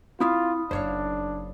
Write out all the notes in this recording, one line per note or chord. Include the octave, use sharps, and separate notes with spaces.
C4 E4 F4 F5 B5 D#6
F#1 D4 D#4 C5 C#5 F5